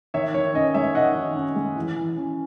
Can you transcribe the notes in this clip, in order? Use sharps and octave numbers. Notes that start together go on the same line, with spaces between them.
D#3 C#5 E5
D#3 C#5
C#4 D#5
G#3 C#5 E5
D#3 D#5 F#5
D#3
C#4
G#3
E3
E3
C#4